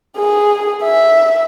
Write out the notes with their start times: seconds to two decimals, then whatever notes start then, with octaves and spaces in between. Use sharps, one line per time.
0.17 G#4
0.83 E5